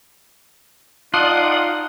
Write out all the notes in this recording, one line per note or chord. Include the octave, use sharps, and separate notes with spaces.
D#4 F4 D5 F#5 A5 D#6 F#6